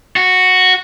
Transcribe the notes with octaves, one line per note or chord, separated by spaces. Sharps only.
F#4